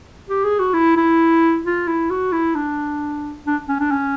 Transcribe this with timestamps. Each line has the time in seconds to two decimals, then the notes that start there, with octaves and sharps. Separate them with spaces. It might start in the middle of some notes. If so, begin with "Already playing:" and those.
0.29 G4
0.44 G#4
0.59 F#4
0.74 E4
0.97 E4
1.65 F4
1.88 E4
2.10 F#4
2.32 E4
2.55 D4
3.46 D4
3.68 C#4
3.80 D4
3.91 C#4